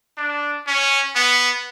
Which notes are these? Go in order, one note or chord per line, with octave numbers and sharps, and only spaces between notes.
D4
C#4
B3